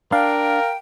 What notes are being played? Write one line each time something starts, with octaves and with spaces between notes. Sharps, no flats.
D4 A#4 F5 G5